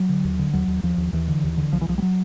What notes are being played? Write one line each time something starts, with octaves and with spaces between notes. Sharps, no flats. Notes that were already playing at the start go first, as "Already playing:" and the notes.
Already playing: F#3
D3
D#2
D3
D#2 F#3
D#2
D#2 F3
D#2
D#2 E3
D3
D#2
D3
C2 F3
E3
C2 F3
G3
F#3